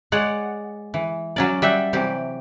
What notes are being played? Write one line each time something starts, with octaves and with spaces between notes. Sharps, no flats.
G#3 C#5 D5 F#5
E3
F#3 C#4 D5
G3 E5 F#5 G5
C3 E3 F#3 G4